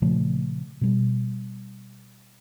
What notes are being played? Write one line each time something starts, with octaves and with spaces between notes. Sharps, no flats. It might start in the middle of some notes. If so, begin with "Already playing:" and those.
A#2 C#3 F3 A3
B2 G3